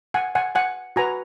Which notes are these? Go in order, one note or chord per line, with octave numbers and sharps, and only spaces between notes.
F#5 G#5
F#5 G#5
F#5 G#5
F#4 B4 G#5 A#5